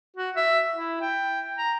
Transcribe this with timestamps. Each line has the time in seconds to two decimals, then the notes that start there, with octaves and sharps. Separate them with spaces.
0.17 F#4
0.36 E5
0.73 E4
1.01 G5
1.58 A#5